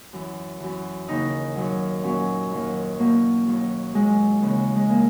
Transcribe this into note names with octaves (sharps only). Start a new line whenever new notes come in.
F#2 E3
F#2 E3
D#2 C#3 E3 D#4
F#2 D#3 F#3
A#2 F#3 C#4
D#2 D#3 F#3
E2 B2 F#3 A#3
D#2 D#3 F#3
A#2 F#3 G#3
D#2 C#3 E3
G#3
E3 A#3